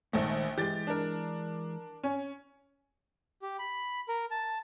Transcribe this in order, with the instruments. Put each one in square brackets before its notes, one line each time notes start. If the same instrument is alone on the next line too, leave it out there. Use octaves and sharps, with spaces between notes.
[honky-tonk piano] A#1 A3 [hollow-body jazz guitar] G#2 D#3
[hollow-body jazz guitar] E3 G#3 [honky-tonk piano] G4 A6
[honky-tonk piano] D4 A#4
C#4
[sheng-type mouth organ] G4
B5
A#4
A5